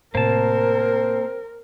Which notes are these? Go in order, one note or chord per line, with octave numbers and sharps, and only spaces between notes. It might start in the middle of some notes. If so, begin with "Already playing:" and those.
A2 C3 A#3 C4 A#4 A5